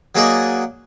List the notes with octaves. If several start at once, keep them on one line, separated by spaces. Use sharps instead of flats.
F#3 A#3 F#4 G#4 D5 D#5